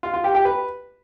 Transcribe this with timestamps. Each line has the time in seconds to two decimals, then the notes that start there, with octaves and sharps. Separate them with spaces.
0.03 F4
0.14 F4
0.24 G4
0.35 G4
0.45 B4